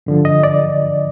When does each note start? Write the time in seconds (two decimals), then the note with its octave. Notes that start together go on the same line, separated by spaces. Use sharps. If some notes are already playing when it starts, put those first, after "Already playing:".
0.06 G2 D3 F3
0.25 D#5
0.44 D5